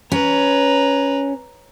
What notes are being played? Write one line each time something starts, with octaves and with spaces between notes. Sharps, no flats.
C#4 B4 A#5